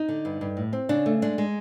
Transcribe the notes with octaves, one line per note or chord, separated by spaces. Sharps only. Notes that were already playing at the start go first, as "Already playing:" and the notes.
Already playing: D#4
D3
G2
G2
A2
C4
C#3 D4
A3
G#3 D4
G#3